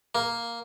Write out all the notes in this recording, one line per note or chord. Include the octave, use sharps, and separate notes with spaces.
A#3